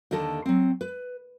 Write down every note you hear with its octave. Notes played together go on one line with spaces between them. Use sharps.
D#2 D3 A4 D#5 A5
F#3 C4
B4